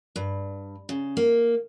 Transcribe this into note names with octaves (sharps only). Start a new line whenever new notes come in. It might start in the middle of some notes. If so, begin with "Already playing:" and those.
G2
C#3
A#3